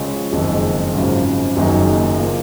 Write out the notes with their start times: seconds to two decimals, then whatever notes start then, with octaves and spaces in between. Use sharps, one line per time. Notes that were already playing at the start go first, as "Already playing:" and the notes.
Already playing: C#2 C#3 F3 G#3 C#4
0.32 F#1 F2 D#3
0.94 G#1 F#2 C#3 F3
1.56 F#1 F#2 D#3 A#3 D#4
2.19 F3 A#3